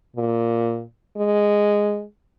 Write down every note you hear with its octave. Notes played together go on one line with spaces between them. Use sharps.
A#2
G#3